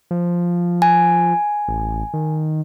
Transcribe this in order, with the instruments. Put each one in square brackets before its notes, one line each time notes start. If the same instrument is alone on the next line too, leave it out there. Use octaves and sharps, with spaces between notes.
[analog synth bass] F3
[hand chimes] G#5
[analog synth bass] A1
D#3